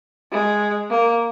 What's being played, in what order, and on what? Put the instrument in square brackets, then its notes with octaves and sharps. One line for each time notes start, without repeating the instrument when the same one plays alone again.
[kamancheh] G#3
A#3